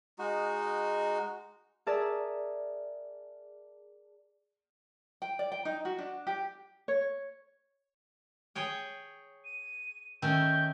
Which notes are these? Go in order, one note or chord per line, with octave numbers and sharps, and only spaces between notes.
G#3 D#4 F#4
G#4 A#4 D5 E5 A5
G5
D5
G5
D#4
F#4
D4
G4
C#5
G#4 C#5 G5
D#7
D#3 A3 C#4 G6